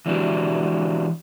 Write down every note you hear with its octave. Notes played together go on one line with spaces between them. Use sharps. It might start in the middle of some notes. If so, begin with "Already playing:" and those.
E3 G#3 D4 F#4 G4